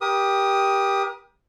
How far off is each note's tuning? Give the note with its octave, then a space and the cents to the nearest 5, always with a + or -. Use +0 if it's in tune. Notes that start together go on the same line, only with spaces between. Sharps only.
G4 +10 A#4 +40 D#6 +5